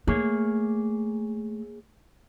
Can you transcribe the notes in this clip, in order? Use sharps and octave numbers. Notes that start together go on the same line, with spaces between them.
A3 A#3 G#4 C#5